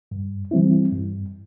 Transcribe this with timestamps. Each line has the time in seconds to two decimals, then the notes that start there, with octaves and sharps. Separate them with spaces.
0.11 G2
0.51 E3 G3 C4 E4
0.92 G2